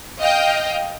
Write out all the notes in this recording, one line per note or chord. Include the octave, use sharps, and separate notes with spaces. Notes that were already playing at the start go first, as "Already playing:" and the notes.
D#5 F5 G5